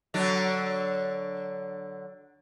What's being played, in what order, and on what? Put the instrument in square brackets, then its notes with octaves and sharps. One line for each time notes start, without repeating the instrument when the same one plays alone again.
[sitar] D3 F#3 D4